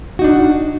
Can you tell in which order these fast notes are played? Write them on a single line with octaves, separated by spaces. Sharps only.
F#4 D#4 D4